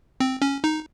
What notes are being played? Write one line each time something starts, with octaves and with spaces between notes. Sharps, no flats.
C4
C#4
D#4